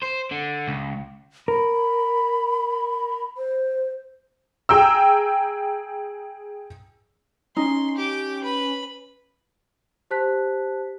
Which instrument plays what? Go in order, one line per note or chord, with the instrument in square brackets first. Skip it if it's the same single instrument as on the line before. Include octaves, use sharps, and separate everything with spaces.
[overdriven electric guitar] C5
D3
C#2
[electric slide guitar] A#4 [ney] B5
[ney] C5
[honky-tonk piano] G#4 G5 A#5 E6
[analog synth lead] C#4 [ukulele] D#4 [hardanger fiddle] C6
[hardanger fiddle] G4 D6
B4 B5
[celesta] G4 C5 A5 F#6 B6